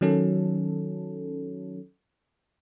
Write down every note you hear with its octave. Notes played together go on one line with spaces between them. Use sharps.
D#3 F#3 C#4 A4